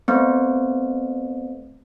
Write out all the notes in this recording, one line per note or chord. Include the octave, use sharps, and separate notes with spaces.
A3 B3 C4